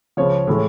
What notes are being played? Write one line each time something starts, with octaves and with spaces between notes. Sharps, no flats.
C#2 C#3 F3 C#5
A2 E3 G#3